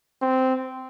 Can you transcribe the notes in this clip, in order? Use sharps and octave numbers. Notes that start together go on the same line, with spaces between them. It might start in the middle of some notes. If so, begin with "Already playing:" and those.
C4